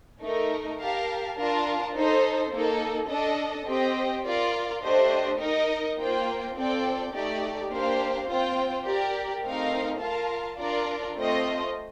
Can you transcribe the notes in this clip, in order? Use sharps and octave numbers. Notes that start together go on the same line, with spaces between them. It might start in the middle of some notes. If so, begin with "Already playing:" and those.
A3 D#4 A#4
G4 A#4 F5 A5
D4 F4 A#4 F5 A5
D#4 A4 C5
A#3 D#4 A4
D4 A4 D#5 A5
C4 G4 C5 D#5 G5
F4 A#4 D5 F5
A3 D4 G4 C5 D#5
D#4 A#4 D#5
A#3 F4 C5 G5
C4 F4 A4 D5 G5
A3 D#4 G4 D5
A#3 D4 G4 C5 F5
C4 F4 C5 G5
G4 A#4 D5
A3 C4 D#4 A#4 F5
F4 A#4 F5 A5
D4 F4 A#4 D5
A3 C4 F4 C5 D#5